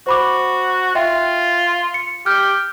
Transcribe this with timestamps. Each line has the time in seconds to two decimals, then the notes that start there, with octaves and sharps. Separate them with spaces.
0.07 F#4 C5 B5 D6
0.95 F4 E5 G5
1.94 C#7
2.26 G4 F6 G6